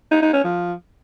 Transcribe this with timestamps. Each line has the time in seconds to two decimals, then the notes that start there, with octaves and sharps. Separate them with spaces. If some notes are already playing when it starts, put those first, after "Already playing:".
0.11 D#4
0.22 D#4
0.33 C#4
0.44 F3